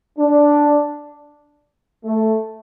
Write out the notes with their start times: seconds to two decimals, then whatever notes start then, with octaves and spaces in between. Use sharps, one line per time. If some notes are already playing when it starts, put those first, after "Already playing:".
0.19 D4
2.04 A3